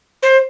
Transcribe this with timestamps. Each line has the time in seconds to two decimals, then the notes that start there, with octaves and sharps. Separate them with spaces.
0.23 C5